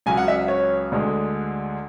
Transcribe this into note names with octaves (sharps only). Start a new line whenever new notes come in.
C#2 C#3 F#3 G#5
F#5
E5
C#5
D2 D3 G#3